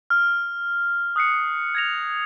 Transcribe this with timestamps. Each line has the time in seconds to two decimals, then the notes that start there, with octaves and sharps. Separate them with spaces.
0.10 F6
1.16 D#6 F#6 C7 C#7
1.75 G#6 A#6 F7